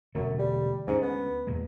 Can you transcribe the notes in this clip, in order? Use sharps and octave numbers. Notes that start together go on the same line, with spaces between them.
E1 F#2 D3 A3
G3
D2 G#2 G#3 C#4
B3
E2 A#2 G#3